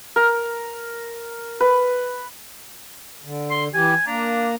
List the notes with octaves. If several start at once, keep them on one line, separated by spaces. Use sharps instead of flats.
A#4
B4
D3
C6
E3 G4 G#5
A#3 D4 A#5